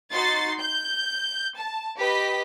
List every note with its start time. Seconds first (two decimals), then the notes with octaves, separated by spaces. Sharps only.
0.12 D#4 F#4 C6 A6
0.59 G6
1.57 A5
1.96 G4 B4 D#5 B6